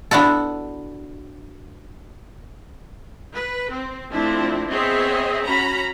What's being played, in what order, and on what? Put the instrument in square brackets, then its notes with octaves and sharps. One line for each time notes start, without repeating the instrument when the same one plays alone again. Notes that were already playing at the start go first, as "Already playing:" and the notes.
[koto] B3 D4 E4 F#4 A4
[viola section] B4
C4
F3 A3 C4 D4 E4
B3 C4 G#4 C#5 D#5 E5
C#4 F#4 A#5 B5